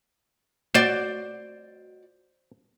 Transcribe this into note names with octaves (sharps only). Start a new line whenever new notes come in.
F#4 C5 D5